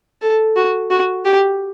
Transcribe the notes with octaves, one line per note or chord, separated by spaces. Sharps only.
A4
F#4
F#4
G4